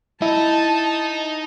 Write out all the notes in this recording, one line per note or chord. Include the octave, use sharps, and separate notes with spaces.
D#4 E4 D#5 A5